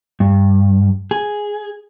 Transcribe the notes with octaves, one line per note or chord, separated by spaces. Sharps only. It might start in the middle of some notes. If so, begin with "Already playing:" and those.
G2
G#4